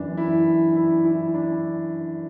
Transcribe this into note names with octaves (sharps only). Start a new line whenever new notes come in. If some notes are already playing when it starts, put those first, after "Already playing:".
Already playing: F#2 E3 D4
E4
E4
E4
D4